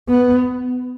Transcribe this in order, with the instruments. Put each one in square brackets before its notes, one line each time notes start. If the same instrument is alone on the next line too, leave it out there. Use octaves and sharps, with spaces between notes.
[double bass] B3